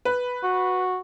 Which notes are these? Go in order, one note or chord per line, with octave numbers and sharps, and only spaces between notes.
B4
F#4